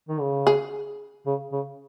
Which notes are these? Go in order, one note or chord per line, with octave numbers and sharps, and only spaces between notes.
D#3
C#3
G#4
C#3
C#3